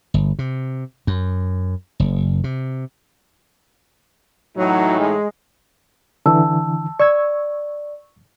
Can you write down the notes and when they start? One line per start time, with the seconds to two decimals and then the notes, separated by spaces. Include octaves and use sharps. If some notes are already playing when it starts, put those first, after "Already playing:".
0.14 G1
0.39 C3
1.07 F#2
2.00 F#1
2.44 C3
4.57 A2 E3 F#3 D#4
4.99 G#3
6.26 D3 E3 A5 E6
7.00 D5 C#6 E6 G#6